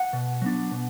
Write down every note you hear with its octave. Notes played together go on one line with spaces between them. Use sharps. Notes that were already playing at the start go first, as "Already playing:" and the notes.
Already playing: F#5
B2
F#3 B3 D4
B2